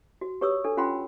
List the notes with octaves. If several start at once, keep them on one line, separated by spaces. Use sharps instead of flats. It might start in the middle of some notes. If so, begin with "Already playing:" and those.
F#4
G4 B4 C#5 C#6 D#6 E6
D4 A4
C#4 F4 F#5 G5 B5 C6